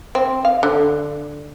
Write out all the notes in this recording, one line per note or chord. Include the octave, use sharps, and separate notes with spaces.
C4
F5
D3